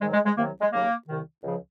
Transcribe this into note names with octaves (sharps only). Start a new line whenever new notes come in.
G#2 D#3 F#3 G#3
G#3
G#3
C2 C3 D#3 F#3 A#3
G#3
D#2 C#3 F#3 A#3
C2 C3 D#3
C#2 C#3 F3